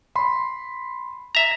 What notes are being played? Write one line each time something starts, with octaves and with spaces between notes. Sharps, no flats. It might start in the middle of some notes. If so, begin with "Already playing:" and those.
B5 C6
E5 A#5